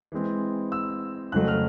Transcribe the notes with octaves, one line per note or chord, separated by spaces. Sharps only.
E3 G#3 C4
E6
F2 C#3 F#3 A3 F#6
F6